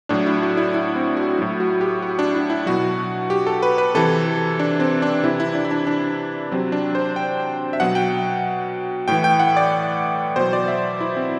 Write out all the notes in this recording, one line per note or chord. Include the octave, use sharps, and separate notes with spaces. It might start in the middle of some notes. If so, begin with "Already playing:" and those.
A2 F#3 D4
E4
F#4
E4
E4
C4
F#4
A2 F#3 E4
F#4
G4
F#4
D4
E4
E4
B2 F#3 F#4
G4
A4
B4
B4
C3 E3 A4
D4
C4
D4
C3 E3 E4
E4
D4
E4
D4
D4
C3 F#3 C4
D4
C5
G5
E5
B2 F#3 F#5
G5
A2 E3 G5
G5
F#5
D5
B2 F#3 C5
D5
E5
E4
C4